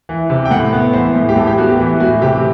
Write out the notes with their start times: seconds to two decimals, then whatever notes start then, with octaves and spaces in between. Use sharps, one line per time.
0.09 E3
0.30 C3
0.45 G5
0.51 A2 F#5
0.73 B3
0.93 E3 C5
1.15 A2
1.29 G4
1.36 A2 A4
1.47 G4
1.58 B3 F#4
1.69 G4
1.80 E3
2.00 A2 F#4
2.22 C3 G4